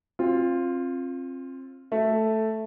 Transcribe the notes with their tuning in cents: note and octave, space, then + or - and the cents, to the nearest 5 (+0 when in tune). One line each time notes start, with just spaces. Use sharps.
C4 +30 F4 +0
A3 +0 E5 +0